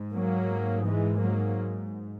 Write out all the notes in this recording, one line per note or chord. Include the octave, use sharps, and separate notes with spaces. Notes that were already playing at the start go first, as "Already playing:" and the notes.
Already playing: G#2
F#3 A#3
E3 G#3
F#3 A#3